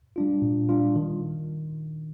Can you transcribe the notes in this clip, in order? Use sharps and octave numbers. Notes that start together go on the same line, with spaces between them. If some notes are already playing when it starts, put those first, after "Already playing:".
G3 D4 F4
A#2
G3 D4 F4
D#3